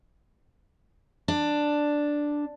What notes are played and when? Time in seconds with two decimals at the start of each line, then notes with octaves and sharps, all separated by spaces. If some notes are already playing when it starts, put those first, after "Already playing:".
1.28 D4